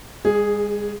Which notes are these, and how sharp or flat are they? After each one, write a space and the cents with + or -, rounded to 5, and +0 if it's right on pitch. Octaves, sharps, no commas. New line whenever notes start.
G#3 -35 G#4 +0